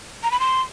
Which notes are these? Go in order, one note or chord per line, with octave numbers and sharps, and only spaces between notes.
A#5
B5
C6